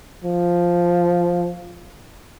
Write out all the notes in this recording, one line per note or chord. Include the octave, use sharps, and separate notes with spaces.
F3